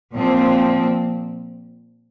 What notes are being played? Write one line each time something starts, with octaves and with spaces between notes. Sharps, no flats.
A#2 F3 C4